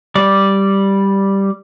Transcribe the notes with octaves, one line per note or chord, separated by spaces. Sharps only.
G3 D5